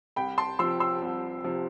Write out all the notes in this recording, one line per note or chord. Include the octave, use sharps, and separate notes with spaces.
C2 G5 B5
A5 C6
C3 F3 C6 E6
C6 E6
C2
C3 F3